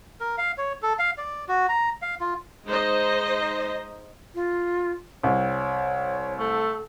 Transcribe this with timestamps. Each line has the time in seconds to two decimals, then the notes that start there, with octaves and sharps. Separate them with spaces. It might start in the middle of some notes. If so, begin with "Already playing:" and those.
0.20 A#4
0.38 F5
0.58 C#5
0.83 A4
0.99 F5
1.18 D5
1.48 F#4
1.69 A#5
2.02 F5
2.20 F4
2.66 G#3 D#4 C5 D#5
4.35 F4
5.23 C2 C#5
6.38 A3 A4